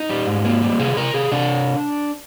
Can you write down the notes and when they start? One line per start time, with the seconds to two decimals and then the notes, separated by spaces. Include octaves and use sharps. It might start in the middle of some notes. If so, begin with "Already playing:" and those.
Already playing: D#4
0.10 G3
0.27 G#2
0.45 A#3
0.62 G3
0.79 C3 G#4
0.97 C3 A#4
1.14 C3 G#4
1.31 C3 D4